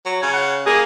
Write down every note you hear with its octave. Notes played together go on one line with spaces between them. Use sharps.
F#3
C#3 G#5
F#5
A#3 G#4 D#5